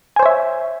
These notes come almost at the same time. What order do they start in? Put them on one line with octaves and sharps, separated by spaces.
G#5 C5 C#5 E5